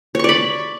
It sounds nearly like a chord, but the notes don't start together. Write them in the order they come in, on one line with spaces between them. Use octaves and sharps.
C#5 C#6 D5 B5